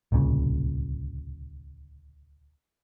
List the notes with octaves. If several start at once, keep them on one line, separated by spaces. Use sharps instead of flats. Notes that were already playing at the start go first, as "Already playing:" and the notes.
D1 C2 A#2 C#3